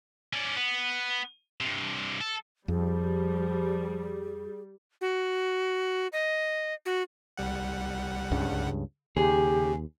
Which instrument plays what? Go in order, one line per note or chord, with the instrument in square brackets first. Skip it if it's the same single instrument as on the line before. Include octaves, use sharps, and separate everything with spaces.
[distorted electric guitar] C#4 D5
B3
G2 C3
A4
[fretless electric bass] F2 [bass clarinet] F3 [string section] G3 [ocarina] G#4
[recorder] F#4
D#5
F#4
[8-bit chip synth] C2 G3 F#5
[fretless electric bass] C#2 G2 C#3
[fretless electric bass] D#2 [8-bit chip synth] C#3 [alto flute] G4 [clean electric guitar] G#4